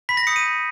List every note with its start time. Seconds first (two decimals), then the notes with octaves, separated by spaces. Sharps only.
0.09 B5 B6
0.17 A#6
0.27 D#6 G6 C#7
0.36 D#7
0.44 B5